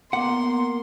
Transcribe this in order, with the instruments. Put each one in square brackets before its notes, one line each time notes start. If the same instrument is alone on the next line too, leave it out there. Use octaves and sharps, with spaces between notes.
[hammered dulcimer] A#3 [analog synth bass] B3 [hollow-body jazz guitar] F#5 [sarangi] C6